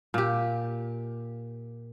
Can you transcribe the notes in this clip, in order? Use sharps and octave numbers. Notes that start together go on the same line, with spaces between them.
A#2 G4